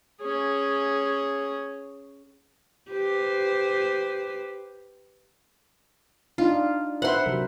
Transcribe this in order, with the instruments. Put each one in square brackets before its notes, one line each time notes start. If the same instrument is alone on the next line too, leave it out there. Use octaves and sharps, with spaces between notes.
[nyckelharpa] C#4 G#4
[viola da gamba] G4 B4 C5
[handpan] D4 D#4 [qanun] F4
[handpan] B4 C5 E5 [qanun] F#5 C6
[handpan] C3 F#3 A#4